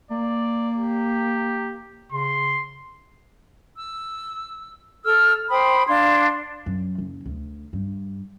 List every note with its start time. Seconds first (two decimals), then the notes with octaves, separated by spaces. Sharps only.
0.11 A#3 D5
0.78 G4
2.12 C#3 C6
3.77 E6
5.04 A4 E6 F6
5.50 C5 G5 B5 D#6
5.87 D4 F5 C6 G#6
6.66 F#2
6.98 F#1
7.25 D2
7.73 G2